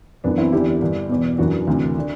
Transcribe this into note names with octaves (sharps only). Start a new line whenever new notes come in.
F#2 E3 B3 D4
C4 E4
E2 D3 E4 G4
G2 D3
E2 B2
F#2 E3 D4 F#4
D2 C3 E3
D3